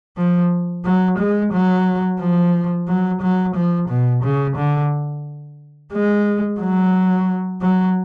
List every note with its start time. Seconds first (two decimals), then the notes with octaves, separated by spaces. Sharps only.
0.17 F3
0.84 F#3
1.18 G#3
1.53 F#3
2.20 F3
2.88 F#3
3.22 F#3
3.55 F3
3.88 B2
4.23 C#3
4.56 D3
5.92 G#3
6.60 F#3
7.61 F#3